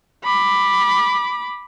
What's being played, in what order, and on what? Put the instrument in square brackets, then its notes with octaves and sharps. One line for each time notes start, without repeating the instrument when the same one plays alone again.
[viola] B5 D6